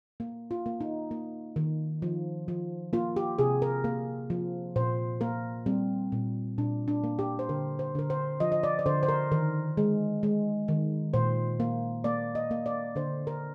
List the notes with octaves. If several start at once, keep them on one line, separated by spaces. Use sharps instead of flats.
A#3
F4
A#3
D#4
A#3
D#3
F3
F3
A#3 F4
G4
C3 G#4
A#4
A#3
F3
A#2 C5
A#3 A#4
G3 C4
A#2
A#2 D4
D4
A#3
G4
C5
D3 A#4
C5
D3 A#4
C5
F3 D#5
D#5
D5
D5
D3 C5
C5
A#4
D#3 A#4
G#3
G#3
D#3
A#2 C5
A#3
A#3 D5
D#5
A#3
D5
D3 C5
A#4